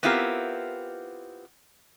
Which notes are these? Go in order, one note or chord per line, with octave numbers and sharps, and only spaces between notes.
B3 C4 E4 F4 G4 A#4